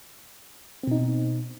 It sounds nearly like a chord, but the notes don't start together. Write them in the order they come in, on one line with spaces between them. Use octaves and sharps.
C4 B2 D#4